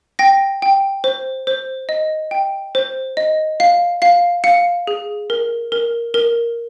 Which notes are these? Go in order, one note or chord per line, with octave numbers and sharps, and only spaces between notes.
G5 A#6
G5
C5
C5
D#5
G5
C5
D#5
F5 C7
F5 C7
F5 C#7
G#4
A#4
A#4
A#4